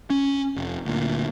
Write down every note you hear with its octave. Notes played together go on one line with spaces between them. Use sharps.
C#4
F1
D2 A#2